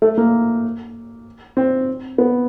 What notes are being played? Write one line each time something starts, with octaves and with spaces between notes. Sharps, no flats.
A3
A#3
C4
B3